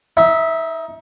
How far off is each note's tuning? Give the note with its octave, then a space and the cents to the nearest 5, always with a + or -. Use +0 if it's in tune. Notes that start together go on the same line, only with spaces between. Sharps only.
D#4 +25 E5 -10